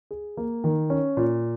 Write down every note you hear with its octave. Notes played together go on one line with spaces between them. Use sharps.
G#4
A#3
D#3
C#4
A#2